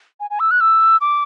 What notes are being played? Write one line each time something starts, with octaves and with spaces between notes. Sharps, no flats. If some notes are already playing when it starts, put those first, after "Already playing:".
G#5
G#5
E6
F#6
E6
D6